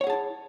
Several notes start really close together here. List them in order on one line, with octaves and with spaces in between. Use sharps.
C#5 F#5 G#4 A5 E4